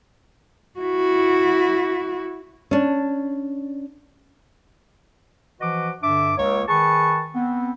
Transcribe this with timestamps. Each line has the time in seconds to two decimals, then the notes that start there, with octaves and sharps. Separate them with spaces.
0.80 E4 F#4
2.71 C#4 D4
5.61 E3 F3 F#4 B4 D#5 D6
6.03 G2 D3 D4 E5 D6
6.37 C#2 A#3 C#5
6.68 D#3 G#4 B4 A5 C#6
7.34 B3 C4